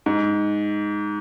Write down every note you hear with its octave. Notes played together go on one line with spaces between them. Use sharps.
G#2